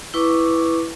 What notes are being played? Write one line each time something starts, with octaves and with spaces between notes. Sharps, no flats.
E4 B4 C#6 D6